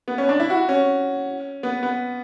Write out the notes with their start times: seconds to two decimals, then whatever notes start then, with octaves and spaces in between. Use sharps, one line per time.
0.08 B3
0.18 C#4
0.29 D4
0.40 E4
0.50 F#4
0.69 C#4
1.63 B3
1.83 B3